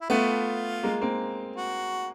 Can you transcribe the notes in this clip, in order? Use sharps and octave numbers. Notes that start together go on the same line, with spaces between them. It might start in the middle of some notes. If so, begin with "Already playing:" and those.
E4
A3 B3 F4
G#3 A#3
A#3 C4
F#4